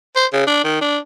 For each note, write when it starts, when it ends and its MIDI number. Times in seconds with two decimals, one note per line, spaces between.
0.16 0.26 72
0.33 0.47 49
0.47 0.59 62
0.64 0.77 51
0.81 0.98 62